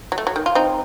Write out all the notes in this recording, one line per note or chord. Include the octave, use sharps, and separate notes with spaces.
F#3
A3
F#3
D#3
F4
C4 D#4